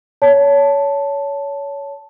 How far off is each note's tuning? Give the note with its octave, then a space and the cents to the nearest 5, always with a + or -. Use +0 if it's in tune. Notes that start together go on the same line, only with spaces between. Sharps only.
C#5 +25 A5 +0